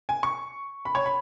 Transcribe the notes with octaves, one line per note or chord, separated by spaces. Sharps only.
G#5
C#6
B5
C#5
B5